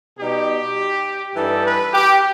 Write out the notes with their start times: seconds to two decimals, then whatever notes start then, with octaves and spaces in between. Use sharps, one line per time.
0.18 B2 G3 D#4 G4
1.34 G2 E3 G3 D#4 A4
1.64 B4
1.93 G4